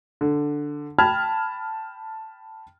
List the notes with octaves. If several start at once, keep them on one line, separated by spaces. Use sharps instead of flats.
D3
G5 A5 B5 F6 G#6